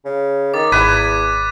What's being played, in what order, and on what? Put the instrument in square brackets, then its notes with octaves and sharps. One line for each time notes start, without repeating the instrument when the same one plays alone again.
[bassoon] C#3
[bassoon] D#3 [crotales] D6 A6
[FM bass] G#1 [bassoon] E2 [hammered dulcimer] B4 [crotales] G#6 B6 D#7